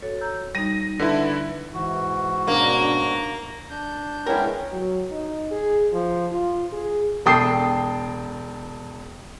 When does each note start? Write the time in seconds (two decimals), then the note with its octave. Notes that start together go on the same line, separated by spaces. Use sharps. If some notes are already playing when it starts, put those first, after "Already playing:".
0.02 F#4 A4 C#5
0.21 A#5 E6 G6
0.55 G3 D#4 A#6 D#7
0.99 D3 E4 B4
1.74 G#2 E3 F#4
2.47 B2 A#3 C#4 D4 A#5
3.70 D4 G6
4.27 G#3 B3 C#4 E4 A#4 G5
4.72 F#3
5.11 D#4
5.51 G#4
5.93 F3
6.32 F4
6.72 G#4
7.26 E1 A4 G5 A5 D#6 C7